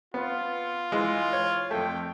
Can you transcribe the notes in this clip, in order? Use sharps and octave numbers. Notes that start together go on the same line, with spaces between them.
B3 F4
E3 G#3
C#5
F2 A3 G5